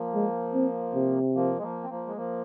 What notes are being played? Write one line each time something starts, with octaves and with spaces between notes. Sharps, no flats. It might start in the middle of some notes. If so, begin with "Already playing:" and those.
Already playing: F3 A#3
G#3
C4
C3
F3 A#3
G#3
F3 A#3
C4
F3 A#3
G#3
F3 A#3